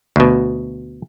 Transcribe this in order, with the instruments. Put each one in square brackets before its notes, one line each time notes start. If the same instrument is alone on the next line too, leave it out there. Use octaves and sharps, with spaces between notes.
[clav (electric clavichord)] D2 B2